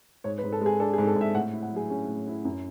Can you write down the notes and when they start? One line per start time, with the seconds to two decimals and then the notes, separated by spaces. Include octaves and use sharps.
0.24 G#2 C#5
0.38 B4
0.44 G#2
0.52 A4
0.61 G#3
0.66 G#4
0.80 D4 A4
0.93 G#4
0.98 G#2
1.07 A4
1.16 G#2 E5
1.35 A2 F#5
1.53 E4
1.62 F#5
1.72 F#3 G#4
1.90 C#4 G#4
2.08 A2
2.27 E4
2.45 F#2